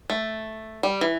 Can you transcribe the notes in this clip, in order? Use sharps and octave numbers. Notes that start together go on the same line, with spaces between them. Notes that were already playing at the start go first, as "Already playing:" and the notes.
A3
G3
E3